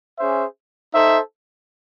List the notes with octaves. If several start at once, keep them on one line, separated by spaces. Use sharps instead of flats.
C#4 G#4 C5 E5
D#4 A4 C5 E5